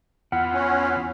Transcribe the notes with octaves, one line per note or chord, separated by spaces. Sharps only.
E2 B3 F4 F#5
C#4